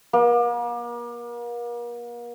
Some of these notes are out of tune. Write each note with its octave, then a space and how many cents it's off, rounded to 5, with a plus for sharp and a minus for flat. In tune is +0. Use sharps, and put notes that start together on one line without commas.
A#3 +40